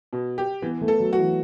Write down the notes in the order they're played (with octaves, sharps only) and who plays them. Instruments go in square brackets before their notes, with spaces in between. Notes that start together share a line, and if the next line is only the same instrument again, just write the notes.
[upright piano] B2
G4
[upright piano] E3 [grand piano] B3
[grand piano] A3
[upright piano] A4
[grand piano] F#3
[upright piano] F#4
[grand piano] E3